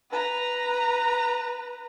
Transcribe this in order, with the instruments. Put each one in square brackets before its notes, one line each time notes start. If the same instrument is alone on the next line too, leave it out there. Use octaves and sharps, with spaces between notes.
[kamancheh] B4 A#5